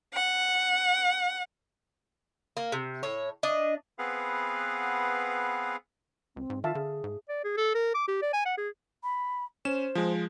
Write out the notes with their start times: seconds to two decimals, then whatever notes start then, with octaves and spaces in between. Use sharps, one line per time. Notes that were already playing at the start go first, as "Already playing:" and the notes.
0.14 F#5
2.57 A#3
2.72 C3
3.03 A2 C#5
3.43 D4 D#5
3.99 B3 C4 G#4 B4 F5 F#5
6.36 C#2 C4
6.50 G#2
6.64 D#3 F4 E5 F5 A5
6.75 D3 G#4
7.04 G#2
7.29 D5
7.44 G#4
7.57 A4
7.75 A#4
7.94 D6
8.08 G4
8.22 D5
8.33 G#5
8.45 F#5
8.58 G#4
9.03 B5
9.65 C#4 C5 E7
9.95 F3 G#3